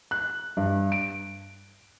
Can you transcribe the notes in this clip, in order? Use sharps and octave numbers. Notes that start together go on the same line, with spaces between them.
F#6
G2
D7